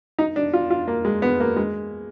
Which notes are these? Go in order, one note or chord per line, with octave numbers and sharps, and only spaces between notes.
D#4
D4
F4
F4
A#3
G#3
B3
A#3
G#3